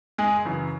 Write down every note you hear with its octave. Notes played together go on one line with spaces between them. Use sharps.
F#1 G#3 G#4
F#2 C#3 E3